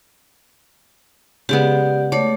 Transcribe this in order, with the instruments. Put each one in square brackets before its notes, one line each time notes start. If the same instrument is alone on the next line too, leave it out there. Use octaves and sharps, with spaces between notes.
[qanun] C#3 G#3 B3 [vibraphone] G4 D5
[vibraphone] A3 C#5 [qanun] D5